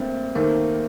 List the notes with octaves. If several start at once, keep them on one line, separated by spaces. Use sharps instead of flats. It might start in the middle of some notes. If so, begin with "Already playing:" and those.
Already playing: G2 D3 A3 A#3 C4
D#2 D#3 A3 A#3 C4